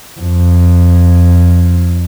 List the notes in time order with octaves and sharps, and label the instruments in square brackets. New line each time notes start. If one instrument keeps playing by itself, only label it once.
[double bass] F2